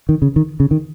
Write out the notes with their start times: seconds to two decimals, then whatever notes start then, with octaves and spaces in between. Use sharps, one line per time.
0.09 D#3
0.22 C#3
0.36 D#3
0.60 C#3
0.71 D#3